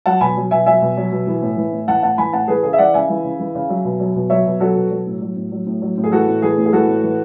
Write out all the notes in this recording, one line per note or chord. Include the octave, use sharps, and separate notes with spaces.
F#3 F#5 A5
B2 G#5 B5
F#3
B2 E5 G#5
F#3 E5 G#5
B2
F#3
B2
E3
A2
E3
A2
E3 F#5 A5
A2 F#5 A5
E3 G#5 B5
A2 F#5 A5
E3 G#4 B4
C#3 G#4
E5
E3 D5 F#5
C#3 E5 G#5
E3
C#3
E3
C#3
F#3
B2
F#3
B2
F#3 C#5 E5
B2
F#3 F#4 A4
B2
F#3
A2
F#3
A2
F#3
A2
F#3
A2
G#4
E3 F#4 A4
A2
E3 G#4
A2
G#4
E3 F#4 A4
A2
E3